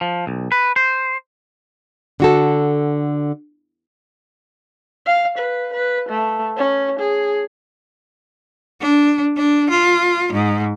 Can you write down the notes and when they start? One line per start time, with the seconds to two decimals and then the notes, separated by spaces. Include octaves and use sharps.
0.01 F3
0.27 B1
0.52 B4
0.76 C5
2.20 D3 F#4 A4
5.06 F5
5.38 B4
5.74 B4
6.09 A3
6.57 C#4
6.99 G#4
8.81 D4
9.36 D4
9.70 F4
10.33 G#2